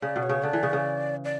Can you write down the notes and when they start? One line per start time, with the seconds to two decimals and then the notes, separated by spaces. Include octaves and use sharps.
0.02 C#3 D5
0.16 B2
0.23 C#5
0.29 C#3
0.43 D3 D5
0.53 E3
0.63 C#3
0.73 C#3
1.25 D5